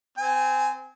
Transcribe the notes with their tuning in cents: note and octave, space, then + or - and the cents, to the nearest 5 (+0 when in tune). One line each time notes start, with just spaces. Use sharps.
C4 -25 G#5 +0